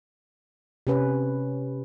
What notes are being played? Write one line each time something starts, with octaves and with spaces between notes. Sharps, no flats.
C3 C#4 B4